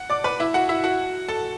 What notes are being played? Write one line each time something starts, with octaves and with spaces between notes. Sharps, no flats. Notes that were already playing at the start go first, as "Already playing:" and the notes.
Already playing: F#5
D5 D6
B4 B5
E4 E5
F#4 F#5
E4 E5
F#4 F#5
A4 A5